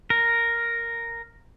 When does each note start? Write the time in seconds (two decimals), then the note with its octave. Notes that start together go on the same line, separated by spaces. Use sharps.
0.10 A#4